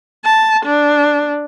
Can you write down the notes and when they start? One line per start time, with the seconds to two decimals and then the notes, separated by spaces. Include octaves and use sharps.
0.24 A5
0.66 D4